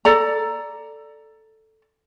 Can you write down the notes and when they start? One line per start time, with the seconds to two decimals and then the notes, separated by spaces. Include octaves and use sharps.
0.05 A4 D5 A#5